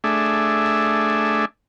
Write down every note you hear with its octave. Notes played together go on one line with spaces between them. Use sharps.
A3 D4 G#4 E5